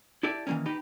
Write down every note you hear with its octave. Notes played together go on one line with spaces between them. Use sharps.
E4 G4 A4 D5
D#3 E3 F#3 A#3 C#4
D#4 G4 B4